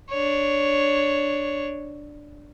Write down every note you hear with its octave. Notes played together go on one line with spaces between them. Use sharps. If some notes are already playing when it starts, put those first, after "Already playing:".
D4 C#5